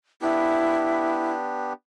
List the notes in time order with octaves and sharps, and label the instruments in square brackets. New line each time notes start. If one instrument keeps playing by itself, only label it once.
[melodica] B3 D4 G4 [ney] E4